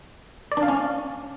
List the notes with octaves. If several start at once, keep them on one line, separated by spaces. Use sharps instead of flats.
D5
D4
F5
C#4